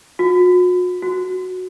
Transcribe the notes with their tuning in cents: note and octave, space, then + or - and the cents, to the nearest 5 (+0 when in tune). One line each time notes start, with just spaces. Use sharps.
F#4 -40
F#4 -5